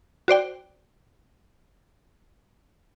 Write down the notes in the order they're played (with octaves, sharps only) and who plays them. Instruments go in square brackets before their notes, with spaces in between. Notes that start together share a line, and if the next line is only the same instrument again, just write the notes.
[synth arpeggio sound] F#4 C5 D5 G5